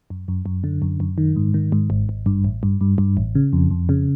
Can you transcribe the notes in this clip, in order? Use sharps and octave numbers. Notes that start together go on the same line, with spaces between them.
F#2
F#2
F#2
D3
F#2
F#2
D#3
G#2
D#3
G#2
G#1
G#1
G2
A1
G2
G2
G2
A1
C#3
F2
F2
C#3